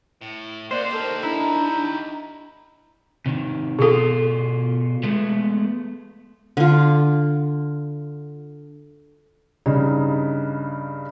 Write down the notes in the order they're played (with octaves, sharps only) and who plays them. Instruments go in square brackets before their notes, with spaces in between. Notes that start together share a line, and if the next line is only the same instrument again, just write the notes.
[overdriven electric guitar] A2
[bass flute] A#3 [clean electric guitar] C5 [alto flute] D5 [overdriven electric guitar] D#5 F#5
[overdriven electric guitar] D#4 G4 [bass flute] A4 [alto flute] A#4
[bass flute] D4 [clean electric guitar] E4 [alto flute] A#5
[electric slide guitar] C3 D#3
[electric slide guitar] B2 F4 [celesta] G#4 A4
[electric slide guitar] G#3 A3 B3
[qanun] D3 F4
[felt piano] G2 C#3 D#4